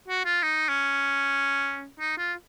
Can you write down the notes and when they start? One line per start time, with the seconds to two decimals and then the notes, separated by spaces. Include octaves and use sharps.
0.08 F#4
0.25 F4
0.43 D#4
0.69 C#4
2.00 D#4
2.18 F4